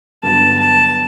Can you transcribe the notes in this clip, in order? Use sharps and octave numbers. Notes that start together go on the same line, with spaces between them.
G2 D3 F#3 B3 A5
A5